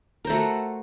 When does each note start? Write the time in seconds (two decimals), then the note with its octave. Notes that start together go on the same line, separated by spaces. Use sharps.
0.25 A#4
0.27 C5
0.30 A3
0.32 F#4